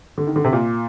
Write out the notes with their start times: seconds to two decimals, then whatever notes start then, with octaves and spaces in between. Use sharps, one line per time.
0.18 D3
0.27 D#3
0.36 D3
0.44 C3
0.53 A#2